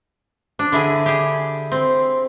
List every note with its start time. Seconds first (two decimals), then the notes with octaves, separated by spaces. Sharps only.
0.59 D4
0.72 D3 E4 G#4
1.06 G4 G#4
1.72 C4